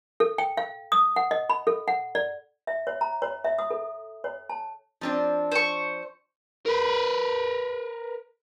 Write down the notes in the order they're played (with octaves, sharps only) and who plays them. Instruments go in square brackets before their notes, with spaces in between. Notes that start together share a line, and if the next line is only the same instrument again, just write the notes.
[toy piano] A4
G5
F5
D#6
F#5
D#5
B5
A4
F#5
D5
E5
C#5
A#5
C#5
E5
D#6
A4
C#5
A5
[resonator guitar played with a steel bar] F3 C4 D4
[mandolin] C5 C#6
[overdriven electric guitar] A#4 B4